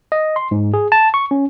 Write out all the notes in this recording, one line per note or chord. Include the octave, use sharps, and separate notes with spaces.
D#5
C6
G#2
G#4
A5
C#6
C#4